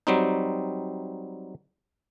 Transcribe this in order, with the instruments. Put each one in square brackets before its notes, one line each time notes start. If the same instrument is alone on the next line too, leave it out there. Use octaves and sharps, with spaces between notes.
[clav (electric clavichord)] F#3 G3 C4 D#4